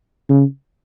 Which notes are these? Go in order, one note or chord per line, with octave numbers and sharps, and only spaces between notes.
C#3